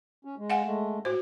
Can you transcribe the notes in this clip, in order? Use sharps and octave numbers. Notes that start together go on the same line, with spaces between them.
C#4
G#3
F5 F#5 G#5
G#3 A3
A2 F#4 C5